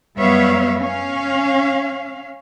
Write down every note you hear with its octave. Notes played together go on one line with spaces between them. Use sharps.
F#2 G3 B3 C#5 E5 F5
C#4 F5